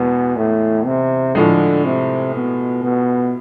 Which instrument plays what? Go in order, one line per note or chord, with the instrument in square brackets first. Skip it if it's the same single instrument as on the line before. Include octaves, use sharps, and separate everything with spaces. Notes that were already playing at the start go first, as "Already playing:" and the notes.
Already playing: [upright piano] E2 G#3 [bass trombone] B2
[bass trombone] A2
C3
[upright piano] A2 F3 G#3 [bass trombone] D3
[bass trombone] C3
B2
B2